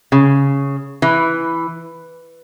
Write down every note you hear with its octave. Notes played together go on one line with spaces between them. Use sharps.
C#3
E3